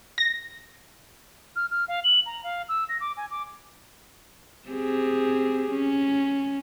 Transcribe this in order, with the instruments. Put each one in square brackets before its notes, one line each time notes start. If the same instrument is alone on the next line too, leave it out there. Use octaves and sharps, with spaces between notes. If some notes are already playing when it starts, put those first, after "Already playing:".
[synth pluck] A#6
[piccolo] F6
F6
F5
F#7
A#5
F5
E6
A#6
D6
G#5
D6
[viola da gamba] C4 G4 G#4
C#4